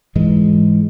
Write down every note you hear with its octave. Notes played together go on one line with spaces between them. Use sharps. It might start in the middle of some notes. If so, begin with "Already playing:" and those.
G#2 E3 G#3